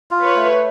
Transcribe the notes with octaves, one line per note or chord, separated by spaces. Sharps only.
F4
B4 C#5
A3